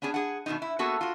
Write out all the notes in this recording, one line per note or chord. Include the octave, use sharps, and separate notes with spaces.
B3 C#4 D4 G#4
G#4 F#5
B2 D#3 E3 B3 D#4
E4
A#3 B3 F#4 G#4 A4
F4 F#4